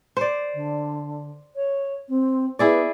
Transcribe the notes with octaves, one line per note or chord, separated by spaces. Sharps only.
C5 D5
D3
C#5
C4
B3 E4 G#4 D5